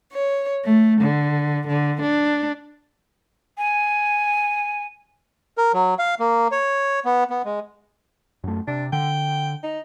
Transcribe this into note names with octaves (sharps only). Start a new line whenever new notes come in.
C#5
A3
D3
D3
D4
G#5
A#4
F#3
F5
A#3
C#5
B3
B3
G#3
F#2 A3
C3 D4
D3 G5
D#4